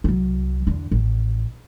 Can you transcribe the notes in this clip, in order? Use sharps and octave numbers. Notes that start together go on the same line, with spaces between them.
C2 F#3
E2 D3
A1